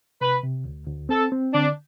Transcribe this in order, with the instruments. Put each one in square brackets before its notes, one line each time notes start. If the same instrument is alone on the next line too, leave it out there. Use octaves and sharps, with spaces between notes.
[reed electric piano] C3 [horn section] B4
[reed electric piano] C3
D2
D2
[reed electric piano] C4 [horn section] A4
[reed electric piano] C4
[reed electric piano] D3 [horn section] D4